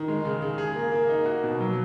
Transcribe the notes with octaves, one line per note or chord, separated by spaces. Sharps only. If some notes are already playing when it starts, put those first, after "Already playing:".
Already playing: D#3
G#3
C#3
C#3
G#4
A#3
A#3
D#4
F#4
B2
F#3